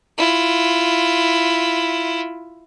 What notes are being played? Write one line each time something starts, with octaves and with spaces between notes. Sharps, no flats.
E4 F4